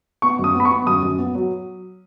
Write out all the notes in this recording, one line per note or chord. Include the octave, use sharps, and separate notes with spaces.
B3 C#6
F#2
D#6
B3
B5
C#6
B3
F#2 D#6
F#2
B3
F#3